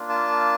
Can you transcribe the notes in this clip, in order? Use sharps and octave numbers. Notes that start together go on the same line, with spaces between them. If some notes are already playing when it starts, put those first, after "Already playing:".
Already playing: A#3 D4 F4
A5